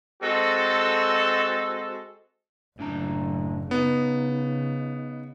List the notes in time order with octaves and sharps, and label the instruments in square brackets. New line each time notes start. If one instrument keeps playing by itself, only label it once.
[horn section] G#3 C4 F#4 A4
[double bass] F#1 [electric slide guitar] A2 D4 A#5
[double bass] C#3 [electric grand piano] B3 [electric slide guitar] D#4